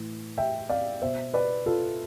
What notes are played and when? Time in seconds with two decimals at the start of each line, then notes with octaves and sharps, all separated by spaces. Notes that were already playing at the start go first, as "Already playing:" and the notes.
Already playing: A2 E3
0.38 E5 G5
0.69 D5 F5
1.01 B2 C5 E5
1.34 B4 D5
1.66 F4 A4